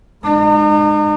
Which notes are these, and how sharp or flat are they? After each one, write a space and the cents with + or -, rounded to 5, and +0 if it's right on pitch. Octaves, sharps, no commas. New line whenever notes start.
G#3 +0 D#4 -45